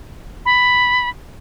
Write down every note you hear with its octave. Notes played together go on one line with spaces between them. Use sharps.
B5